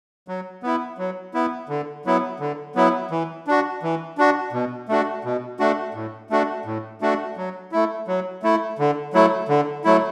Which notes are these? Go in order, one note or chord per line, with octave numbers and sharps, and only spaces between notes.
F#3
B3 E4
F#3
B3 E4
D3
F#3 B3 E4
D3
F#3 B3 E4
E3
D4 F#4
E3
D4 F#4
B2
A3 D4 F#4
B2
A3 D4 F#4
A2
A3 D4 F#4
A2
A3 D4 F#4
F#3
A3 E4
F#3
A3 E4
D3
F#3 A3 E4
D3
F#3 A3 E4